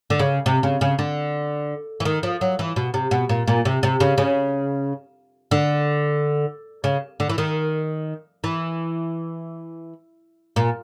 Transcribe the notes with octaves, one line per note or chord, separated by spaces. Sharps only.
D3
C#3
C3
C#3
C#3
D3
E3
D#3
F3
F#3
E3
B2
C3
B2
A#2
A#2
C3
C3
C#3
C#3
D3
C#3
D3
E3
D#3
E3
A#2